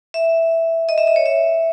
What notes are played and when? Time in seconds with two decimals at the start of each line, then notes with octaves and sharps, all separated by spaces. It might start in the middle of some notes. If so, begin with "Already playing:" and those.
0.14 E5
0.89 D#5
0.98 E5
1.07 D#5
1.16 C#5
1.26 E5